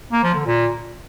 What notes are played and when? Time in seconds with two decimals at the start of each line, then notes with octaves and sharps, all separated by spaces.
0.12 A#3
0.24 F3
0.35 D3
0.46 A#2